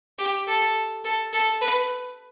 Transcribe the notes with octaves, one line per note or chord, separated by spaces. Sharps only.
G4
A4
A4
A4
B4